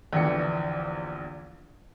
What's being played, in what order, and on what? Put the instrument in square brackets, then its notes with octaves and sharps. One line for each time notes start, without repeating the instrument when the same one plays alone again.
[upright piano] A#1 E2 D3 E3 G4 C#7